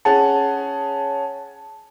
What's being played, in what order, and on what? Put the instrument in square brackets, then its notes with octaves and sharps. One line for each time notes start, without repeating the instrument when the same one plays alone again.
[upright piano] C#4 G#4 F#5 [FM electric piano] A5